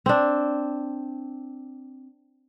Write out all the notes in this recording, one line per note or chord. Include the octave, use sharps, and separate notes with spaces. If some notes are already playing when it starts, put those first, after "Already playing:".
C4 D4